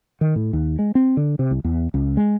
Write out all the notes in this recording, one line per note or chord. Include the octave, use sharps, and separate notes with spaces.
D#3
A2
D#2
G#3
C4
D3
C3
C2
E2
C#2
G#3